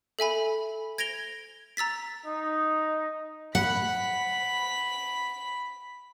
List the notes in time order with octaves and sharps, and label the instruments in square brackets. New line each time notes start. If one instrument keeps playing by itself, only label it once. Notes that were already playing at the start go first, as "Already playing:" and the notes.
[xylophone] A4 E5 G#5 B5
G#6 A#6 D7 F7 G7
A#5 E6 A6 B6
[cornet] D#4
[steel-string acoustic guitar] F#5 [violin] B5 B6